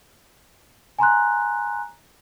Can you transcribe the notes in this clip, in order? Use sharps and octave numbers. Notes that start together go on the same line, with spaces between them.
G#5 A#5 C6 F#6